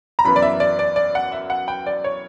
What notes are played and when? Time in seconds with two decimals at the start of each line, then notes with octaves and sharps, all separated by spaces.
0.19 A#5
0.25 F#2 E3 B3 B5
0.36 D5
0.42 E5
0.60 D5
0.79 D5
0.96 D5
1.15 F#5
1.32 E5
1.50 F#5
1.68 G5
1.87 D5
2.04 C#5